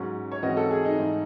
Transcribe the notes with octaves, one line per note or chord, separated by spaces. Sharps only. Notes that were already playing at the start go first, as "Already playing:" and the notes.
Already playing: G#2 F#3 C#4
C#5
G#2 E3 C4 F#4 D#5
A4
G#4
D#4
G#2 E3 A3 D#4